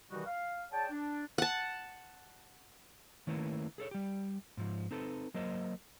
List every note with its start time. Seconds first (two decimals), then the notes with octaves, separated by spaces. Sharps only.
0.10 C3 D#3 E3 G3 D#4 F#4
0.25 F5
0.72 G#4 C#5 D5 G5 A5
0.90 D4
1.38 F#5 A5
3.27 D#3 A3 A#3 C#4 E4 B4
3.78 G#4 A4 C#5
3.91 G3 G4
4.57 G#2 F3
4.91 C4 D#4 A4 B4
5.34 F#3 A#3 A#4 C5 D#5